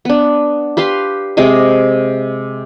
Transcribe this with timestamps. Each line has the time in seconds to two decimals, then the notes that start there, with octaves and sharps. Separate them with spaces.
0.05 B3 D4
0.77 G4 B4 F5 C6
1.37 C3 G#3 D#5 D6